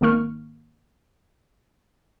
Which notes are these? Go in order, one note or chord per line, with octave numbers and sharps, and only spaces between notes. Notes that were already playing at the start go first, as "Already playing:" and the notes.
G#1 D#3 A#3 C#6 F6